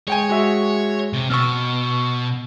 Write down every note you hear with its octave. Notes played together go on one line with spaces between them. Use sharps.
G#3 C#5 G5 G#5
G#3 F#4 E5
C3
B2 C#6 E6 F6